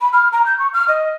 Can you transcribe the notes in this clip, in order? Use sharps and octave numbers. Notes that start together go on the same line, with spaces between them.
B5
F6
A#5
G6
C#6
F6
D#5